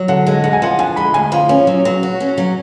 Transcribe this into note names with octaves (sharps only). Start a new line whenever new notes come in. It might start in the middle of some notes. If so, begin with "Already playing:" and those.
Already playing: F#3
D3 F#5
G#3
D2 F#5
G#5
F3 F#5
D3 G#5
G#3 B5
D2 G#5
F3
C#4
F#3
F#3
F#4
C#4
F#3